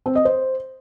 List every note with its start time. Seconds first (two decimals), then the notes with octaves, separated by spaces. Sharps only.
0.06 C4
0.15 D#5
0.25 C5